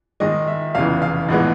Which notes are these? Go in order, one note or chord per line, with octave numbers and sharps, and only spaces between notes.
G#2 D#3 G#3 D#5
E5
F1 E2 C#3 E3 F5
F5
A#1 A2 E3 G#3 B3 F#5